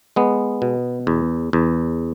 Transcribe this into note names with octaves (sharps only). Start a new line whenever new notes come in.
G#3 B3
B2
E2
E2